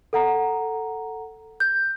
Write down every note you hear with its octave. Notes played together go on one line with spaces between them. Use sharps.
A4 F#5 A#5
G6